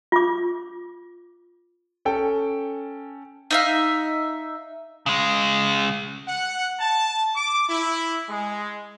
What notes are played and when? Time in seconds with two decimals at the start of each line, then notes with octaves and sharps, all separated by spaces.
0.12 F4 D6
2.05 C#4 A4 G5
3.51 D#4 E5 F5
5.06 C#3 G#3
6.28 F#5
6.80 A5
7.36 D6
7.69 E4
8.29 G#3